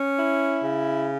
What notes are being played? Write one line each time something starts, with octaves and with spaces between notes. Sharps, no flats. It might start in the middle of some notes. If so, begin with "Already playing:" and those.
Already playing: C#4
E4
C#3